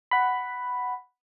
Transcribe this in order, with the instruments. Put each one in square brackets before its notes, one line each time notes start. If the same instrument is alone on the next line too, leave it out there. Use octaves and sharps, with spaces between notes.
[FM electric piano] F#5 B5